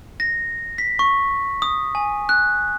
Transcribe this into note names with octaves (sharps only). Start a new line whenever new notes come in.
A#6
B6
C#6
D#6
G#5
F#6